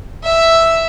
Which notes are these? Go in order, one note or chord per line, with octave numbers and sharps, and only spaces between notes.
E5